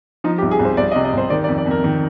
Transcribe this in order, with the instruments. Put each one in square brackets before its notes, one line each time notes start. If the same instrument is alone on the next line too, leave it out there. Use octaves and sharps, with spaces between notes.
[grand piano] F3 D#4
G4
C2
G#4
C2
C5
C2 D5
D#5
C3
D#5
C2 C5
D#3 D5
D5
F2
D5
F2 A#4
D#3